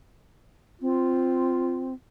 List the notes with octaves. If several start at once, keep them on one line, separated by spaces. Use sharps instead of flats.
C4 F4